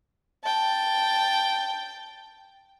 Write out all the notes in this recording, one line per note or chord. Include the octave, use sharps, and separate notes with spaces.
G5 A5